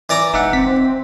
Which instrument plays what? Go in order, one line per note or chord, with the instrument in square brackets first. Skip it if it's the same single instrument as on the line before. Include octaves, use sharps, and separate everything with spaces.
[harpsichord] E3 D5 A#5
[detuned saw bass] E1 [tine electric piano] D#4 E5 F#5
[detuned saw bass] C4 [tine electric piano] B6